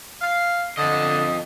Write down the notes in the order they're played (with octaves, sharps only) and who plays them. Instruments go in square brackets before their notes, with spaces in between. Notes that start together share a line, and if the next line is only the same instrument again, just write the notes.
[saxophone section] F5
[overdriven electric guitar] F2 D#5 [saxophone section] D3